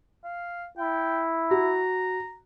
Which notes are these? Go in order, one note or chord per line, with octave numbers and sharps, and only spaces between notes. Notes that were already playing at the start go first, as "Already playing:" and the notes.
F5
E4 G5
F#4 A#5